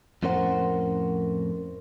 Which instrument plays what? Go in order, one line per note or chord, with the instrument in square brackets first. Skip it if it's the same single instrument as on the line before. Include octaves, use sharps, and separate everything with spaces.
[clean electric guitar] F2 A2 C#4 A#4 C5 F#5